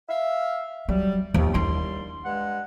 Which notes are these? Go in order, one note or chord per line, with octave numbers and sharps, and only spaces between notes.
E5 F5
F#3 G3
D#2 F3
D#2 G3 D4 E4 C6
G2 G#3 F#5